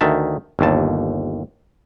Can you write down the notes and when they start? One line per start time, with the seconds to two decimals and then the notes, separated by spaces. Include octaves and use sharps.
0.01 D2 D#3 E5 A5
0.59 G1 D#2 A5